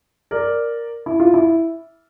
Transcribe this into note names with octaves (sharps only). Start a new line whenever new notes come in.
A#4 D5
E4
F4
E4